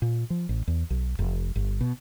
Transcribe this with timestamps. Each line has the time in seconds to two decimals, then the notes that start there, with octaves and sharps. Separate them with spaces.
0.02 A#2
0.30 F3
0.49 A1
0.68 E2
0.90 B1
1.19 F1
1.56 G1
1.81 B2